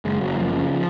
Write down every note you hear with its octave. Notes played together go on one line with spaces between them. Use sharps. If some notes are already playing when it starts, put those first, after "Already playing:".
F#1 G#3
F#1 F#3
F#2 F3
C#3 F3
F3